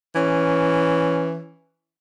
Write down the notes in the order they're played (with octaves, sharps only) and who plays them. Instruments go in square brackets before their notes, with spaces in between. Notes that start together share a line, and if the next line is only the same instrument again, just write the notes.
[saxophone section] E3 C#4